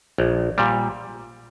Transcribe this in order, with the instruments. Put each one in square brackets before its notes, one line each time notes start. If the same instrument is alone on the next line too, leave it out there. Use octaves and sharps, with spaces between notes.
[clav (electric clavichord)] A#1
A#2 G3